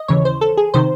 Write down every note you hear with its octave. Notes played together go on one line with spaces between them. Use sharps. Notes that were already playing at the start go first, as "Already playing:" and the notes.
Already playing: D#5
D#2 C#3 E3 C#5
C5
A4
G#4
C3 D#3 C5